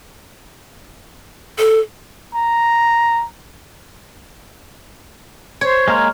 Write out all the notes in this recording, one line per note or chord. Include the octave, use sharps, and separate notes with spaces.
A4
A#5
C5 C#5
G#3 A#3 A#4